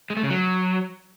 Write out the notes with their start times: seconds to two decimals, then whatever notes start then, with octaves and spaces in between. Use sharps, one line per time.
0.10 G#3
0.17 A3
0.23 C#3
0.30 F#3